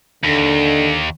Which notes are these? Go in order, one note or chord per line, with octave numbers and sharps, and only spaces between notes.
D#2 D3